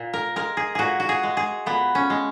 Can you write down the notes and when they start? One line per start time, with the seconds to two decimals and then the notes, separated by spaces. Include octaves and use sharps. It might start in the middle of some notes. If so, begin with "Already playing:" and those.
Already playing: A#2
0.13 A#4
0.36 G#3 A#4
0.57 G#4
0.75 A#2 F#4 G#4
1.00 F#4
1.09 G#4
1.23 G#3
1.37 G#4
1.66 A#2 B3
1.95 C#4
2.10 G#3